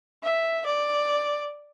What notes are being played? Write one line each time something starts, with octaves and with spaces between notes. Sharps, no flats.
E5
D5